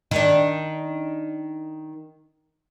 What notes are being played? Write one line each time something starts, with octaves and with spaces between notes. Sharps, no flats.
D#3 D4